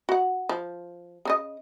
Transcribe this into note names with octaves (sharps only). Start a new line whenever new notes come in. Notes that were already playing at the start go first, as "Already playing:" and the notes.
F#4 F#5
F3
C#3 D#4 D#5